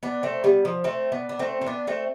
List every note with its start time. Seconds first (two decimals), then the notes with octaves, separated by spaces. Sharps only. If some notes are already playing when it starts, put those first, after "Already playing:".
0.03 B3 D4
0.23 A3 C4
0.44 G3 B3
0.65 F3
0.84 A3 C4
1.12 B3 D4
1.29 D4
1.39 A3 C4
1.61 C4
1.66 B3 D4
1.87 A3 C4